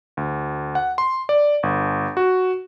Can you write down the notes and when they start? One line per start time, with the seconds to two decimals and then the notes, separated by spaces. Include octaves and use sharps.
0.17 D2
0.75 F#5
0.98 C6
1.29 D5
1.63 G1
2.17 F#4